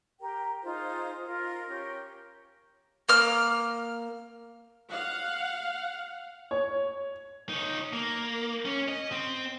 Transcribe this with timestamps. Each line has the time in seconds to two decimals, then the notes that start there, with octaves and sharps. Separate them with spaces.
0.20 G4 A#4 G5
0.63 D#4 F4 G#4 C5
1.25 F4 A#4
1.68 C#4 G4 A#4
3.09 A#3 F6
4.91 F5 F#5
6.51 C#5
7.49 D#4 C#5
7.93 A#3
8.65 C#4
8.88 D#5
9.12 C4